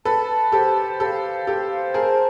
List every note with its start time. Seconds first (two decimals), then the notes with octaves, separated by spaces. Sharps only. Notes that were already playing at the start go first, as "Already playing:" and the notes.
0.05 A4 B4 A5
0.52 G4 A4 C5
0.99 G4 A4 F5
1.47 G4 A4 C5
1.94 G#4 A#4 A5